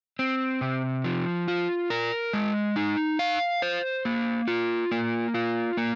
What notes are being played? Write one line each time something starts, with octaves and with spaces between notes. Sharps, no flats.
C4
C3
F3
F4
A#4
G#3
D#4
F5
C5
A#3
F4
A#3
F4
A#3